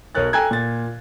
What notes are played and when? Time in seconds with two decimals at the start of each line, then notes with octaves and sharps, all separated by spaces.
0.15 B1 A#4 C#5 F#6 A6
0.33 A4 G5 G#5 A#5 F#6 G#6
0.51 A#2 A6